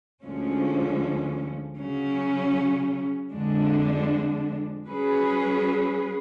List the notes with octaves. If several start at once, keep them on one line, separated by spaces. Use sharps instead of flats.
D2 D3 F3 G#3 C#4
C#3 F#3 C#4
F2 D3 G#3 D4
F#3 C#4 G#4 B4